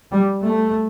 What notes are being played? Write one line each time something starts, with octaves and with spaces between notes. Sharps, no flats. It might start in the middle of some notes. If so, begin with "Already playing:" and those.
G3
A3